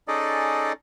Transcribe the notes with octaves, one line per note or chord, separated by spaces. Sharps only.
C#4 D#4 G#4 A4 D5 D#5